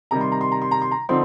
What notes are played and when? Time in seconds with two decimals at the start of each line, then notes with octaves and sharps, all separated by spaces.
0.11 C3 D#3 G3 A#5
0.21 C6
0.32 A#5
0.41 C6
0.52 A#5
0.62 C6
0.71 A#5
0.82 C6
0.91 A#5
1.09 D3 F3 C4 D#4 C6